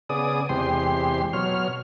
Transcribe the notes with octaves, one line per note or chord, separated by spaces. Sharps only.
C#3 B3 G#4 D5 D#6
E2 C3 G#3 G4 C6
B2 F#3 C#5 F6